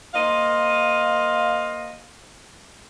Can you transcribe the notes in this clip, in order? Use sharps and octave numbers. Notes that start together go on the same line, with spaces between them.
A#3 C5 D#5 F5